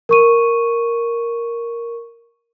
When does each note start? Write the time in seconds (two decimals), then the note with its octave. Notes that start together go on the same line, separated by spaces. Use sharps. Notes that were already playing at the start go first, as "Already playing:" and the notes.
0.09 A#4 C#6 D#7